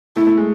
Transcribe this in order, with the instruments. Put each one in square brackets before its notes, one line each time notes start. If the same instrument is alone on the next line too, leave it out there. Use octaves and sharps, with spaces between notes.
[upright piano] A3 [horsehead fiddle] E4
[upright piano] A3
G#3